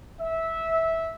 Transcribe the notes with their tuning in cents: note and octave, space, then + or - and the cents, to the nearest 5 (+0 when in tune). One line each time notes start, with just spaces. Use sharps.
E5 -15